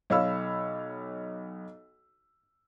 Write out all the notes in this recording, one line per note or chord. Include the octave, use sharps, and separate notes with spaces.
B1 C#5 F5 B5 E6